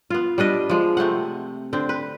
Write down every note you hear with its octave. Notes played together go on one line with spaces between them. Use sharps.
B3 F4
G3 D4 B4 D#5
F3 G#3
C3 A3 C4 F#5
D3 C4
B4